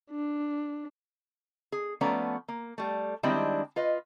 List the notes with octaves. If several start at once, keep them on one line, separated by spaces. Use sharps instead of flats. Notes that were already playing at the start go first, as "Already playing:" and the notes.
D4
G#4
F3 A3 B3 C#4 D5 A#5
A#3
G3 A3
D#3 G3 G#3 C4 D4 E4
F4 B4 D#5